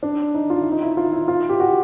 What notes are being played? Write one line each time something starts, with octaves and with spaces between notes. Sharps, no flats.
D4
D#4
F4
E4
D#4
E4
F4
E4
F4
G4
F#4